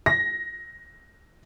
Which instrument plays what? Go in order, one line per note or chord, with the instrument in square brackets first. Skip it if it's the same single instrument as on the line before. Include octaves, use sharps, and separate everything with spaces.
[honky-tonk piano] A#6